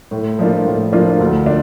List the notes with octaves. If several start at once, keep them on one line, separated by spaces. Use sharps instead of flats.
A2
F3 A#3 D4 F4
A2
F3 A#3 D4 F4
D2
D4